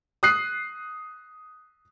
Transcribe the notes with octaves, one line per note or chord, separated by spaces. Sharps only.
D#6 F#6 C7